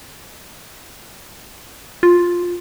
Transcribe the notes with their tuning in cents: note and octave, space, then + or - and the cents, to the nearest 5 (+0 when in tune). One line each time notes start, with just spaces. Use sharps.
F4 +5